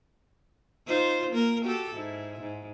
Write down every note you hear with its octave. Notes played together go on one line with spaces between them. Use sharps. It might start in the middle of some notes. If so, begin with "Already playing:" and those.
D#4 F4 C5
A#3 A#4
F#4 G4 A4
G#2 E4
G#2